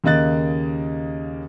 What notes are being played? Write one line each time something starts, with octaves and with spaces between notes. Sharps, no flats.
D#2 C#3 A#3 D#5 F#6 A6